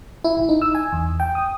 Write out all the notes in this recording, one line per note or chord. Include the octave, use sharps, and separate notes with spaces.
E4
A1
D#4
E6
G#5
E2
G5
D#6